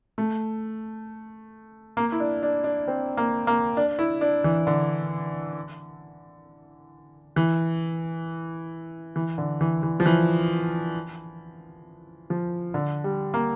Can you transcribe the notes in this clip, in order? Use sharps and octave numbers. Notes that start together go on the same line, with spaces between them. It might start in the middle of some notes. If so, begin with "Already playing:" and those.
A3
A#3
E4
D4
D4
D4
C4
A#3
A#3
D4
E4
D4
E3
D3
E3
E3
D3
E3
E3
F3
E3
F3
D3
G3
A#3